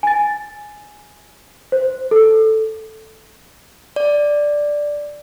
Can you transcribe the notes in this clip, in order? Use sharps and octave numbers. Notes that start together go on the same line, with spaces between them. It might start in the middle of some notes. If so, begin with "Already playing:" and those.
G#5 A6
C5
A4
D5